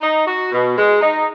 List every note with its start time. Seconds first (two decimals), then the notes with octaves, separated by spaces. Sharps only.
0.01 D#4
0.25 F#4
0.52 B2
0.76 G#3
1.01 D#4